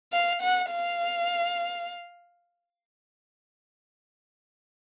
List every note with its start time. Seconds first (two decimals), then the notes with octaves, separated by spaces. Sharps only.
0.13 F5
0.42 F#5
0.70 F5